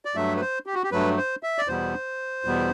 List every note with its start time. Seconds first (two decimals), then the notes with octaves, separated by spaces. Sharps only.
0.05 D5
0.15 G2 F#3 A3 E5
0.36 B4
0.41 C5
0.66 G4
0.74 F#4
0.84 G4
0.92 G2 F#3 A3 B4
1.18 C5
1.43 E5
1.58 D5
1.68 E2 B2 G3 B3 C5
2.44 E2 B2 G3 B3